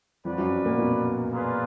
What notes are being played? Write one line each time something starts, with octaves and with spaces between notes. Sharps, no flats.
F2 F3 F#4 B4 D5
F#2 F#3
A#2 A#3
B2 B3
A#3 F4 G#4 B4 D5